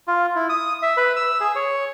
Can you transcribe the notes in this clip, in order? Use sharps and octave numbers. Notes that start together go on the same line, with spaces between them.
F4
E4
D#6
E5
B4
E6
G#4
C#5